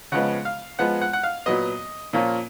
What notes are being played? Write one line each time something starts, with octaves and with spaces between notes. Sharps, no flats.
C#3 F3 G#3 B3 F#5
F5
F3 G#3 B3 F#5
F#5
F#5
F5
A#2 F#3 B3 D#5
A#2 F3 A#3 C#4